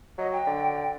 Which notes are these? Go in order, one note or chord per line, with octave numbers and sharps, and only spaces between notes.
F#3 D#5
G5
D3